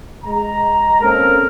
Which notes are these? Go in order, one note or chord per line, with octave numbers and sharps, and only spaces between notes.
G#3 A#5
A#3 C4 C#4 A4 A#4